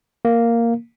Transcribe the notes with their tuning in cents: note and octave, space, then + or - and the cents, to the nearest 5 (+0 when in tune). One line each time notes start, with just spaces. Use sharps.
A#3 -5